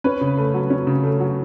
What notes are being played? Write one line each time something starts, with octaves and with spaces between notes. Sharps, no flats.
C#4 B4
C#3
A3
F#3
C#4
C#3
A3
F#3